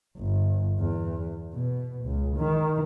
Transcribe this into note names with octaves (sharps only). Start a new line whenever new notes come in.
G1
E2
B2
C#2
D#3